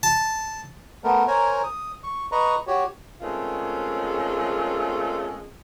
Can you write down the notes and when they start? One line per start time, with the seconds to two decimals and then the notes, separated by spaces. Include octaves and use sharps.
0.03 A5
1.04 A3 B3 A#4
1.28 A#4 C5 C#5 G#5 A#5
1.64 D#6
2.04 C#6
2.32 B4 D#5 A#5 C#6
2.67 F#4 G4 C#5
3.21 D#3 G#3 A3 C4 C#4 F4